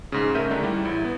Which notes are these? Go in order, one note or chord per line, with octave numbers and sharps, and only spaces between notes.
G#2 C#3
A3 C#4 A#4 E5 G6 D#7
D3 D#3 G#3 A3 D4 D#4
G3 E4 G4
A1 E4
B3